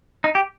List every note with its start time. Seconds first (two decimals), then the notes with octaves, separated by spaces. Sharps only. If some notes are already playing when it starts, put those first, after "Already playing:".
0.24 D#4
0.35 G4